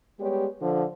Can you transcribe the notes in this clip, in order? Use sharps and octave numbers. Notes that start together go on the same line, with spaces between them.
G3 G#3 B3 G4 C#5
D3 F3